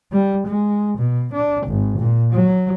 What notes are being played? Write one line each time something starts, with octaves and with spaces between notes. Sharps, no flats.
G3
G#3
B2
D4
G#1
A#2
F#3